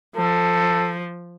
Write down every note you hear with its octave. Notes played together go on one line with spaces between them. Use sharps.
F3 A4